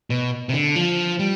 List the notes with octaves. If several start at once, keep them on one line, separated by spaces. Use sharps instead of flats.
B2
C3
D3
F3
G3